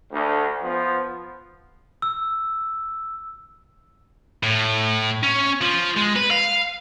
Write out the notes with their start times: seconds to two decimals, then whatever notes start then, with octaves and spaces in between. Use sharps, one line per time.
0.11 D2
0.61 F3 B3
2.02 E6
4.43 A2
5.23 C#4
5.61 F3
5.96 G#3
6.16 B4
6.31 F5